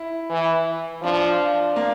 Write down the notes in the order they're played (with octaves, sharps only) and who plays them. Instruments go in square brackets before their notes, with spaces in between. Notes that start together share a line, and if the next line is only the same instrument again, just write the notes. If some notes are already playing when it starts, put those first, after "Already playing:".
Already playing: [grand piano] E4
[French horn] E3
[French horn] F3 [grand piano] D4
[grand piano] A#3